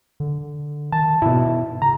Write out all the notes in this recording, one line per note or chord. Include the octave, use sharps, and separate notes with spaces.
D3
D#3 A5
G#2 B2 E4
C#3 A#5